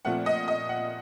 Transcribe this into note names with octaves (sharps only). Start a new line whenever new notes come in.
A#2 F3 A3 C4 F#5
D#5
D#5
F#5